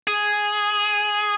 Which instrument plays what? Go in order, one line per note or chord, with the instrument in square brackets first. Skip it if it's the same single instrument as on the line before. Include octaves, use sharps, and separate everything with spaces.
[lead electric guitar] G#4